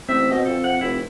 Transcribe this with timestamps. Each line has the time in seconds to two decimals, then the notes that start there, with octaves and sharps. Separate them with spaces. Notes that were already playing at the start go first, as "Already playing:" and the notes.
0.09 A1 C4 E5
0.31 B2 D#5
0.45 F2 A4
0.64 F#5
0.81 F1 E4